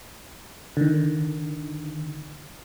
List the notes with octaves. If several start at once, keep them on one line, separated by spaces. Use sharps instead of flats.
D3 D#3